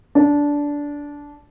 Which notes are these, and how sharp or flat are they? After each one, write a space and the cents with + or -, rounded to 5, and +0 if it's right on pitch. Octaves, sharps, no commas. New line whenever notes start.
D4 -15